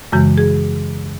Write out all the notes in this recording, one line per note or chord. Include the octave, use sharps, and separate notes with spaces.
F#2 C#3 E3 G#3 F#4
G#4